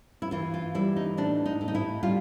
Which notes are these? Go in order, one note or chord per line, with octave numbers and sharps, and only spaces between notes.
E4
E3 F4
F4
G3 E4
D#4
A2 D4
D#4
A2
D#4
E4
G3 F4